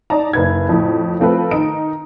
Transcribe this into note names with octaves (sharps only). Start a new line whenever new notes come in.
D#4 D5 A5 A#5
F#1 B4 G#6
F2 A2
F3 A3 C4 F4 A4 B4
D#3 D#4 D7